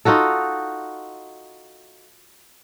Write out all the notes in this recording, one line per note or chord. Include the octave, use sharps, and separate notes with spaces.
D#4 F4 F#4 A4